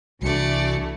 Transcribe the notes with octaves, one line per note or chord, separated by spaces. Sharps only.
C2 E3 G3 A3 D4 F#4 D5 C#7